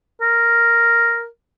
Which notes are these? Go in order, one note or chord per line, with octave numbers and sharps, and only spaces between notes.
A#4